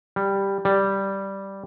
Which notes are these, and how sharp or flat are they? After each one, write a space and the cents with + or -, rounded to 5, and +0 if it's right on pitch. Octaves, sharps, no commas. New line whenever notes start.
G3 +5
G3 -5